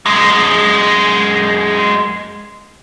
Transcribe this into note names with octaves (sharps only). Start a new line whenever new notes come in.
F#2 G#3